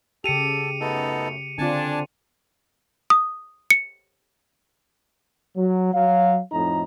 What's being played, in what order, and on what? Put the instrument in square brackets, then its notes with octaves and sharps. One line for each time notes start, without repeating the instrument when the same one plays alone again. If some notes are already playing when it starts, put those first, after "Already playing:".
[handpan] C#3 G4 [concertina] A4 [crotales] C#7 D#7 F7
[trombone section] F#2 A3 [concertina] B3 D#4 A4
[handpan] D3 C4 F4 [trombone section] D4 [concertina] G#5 A5
[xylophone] D#6
C#7
[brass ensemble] F#3
F#3 F5
F2 A2 D#4 D#5 A#5